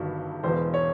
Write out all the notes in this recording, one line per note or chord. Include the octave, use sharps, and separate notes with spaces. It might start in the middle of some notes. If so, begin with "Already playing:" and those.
Already playing: G1 G2 D#3 F#3
E1 E2 B2 C5
C#5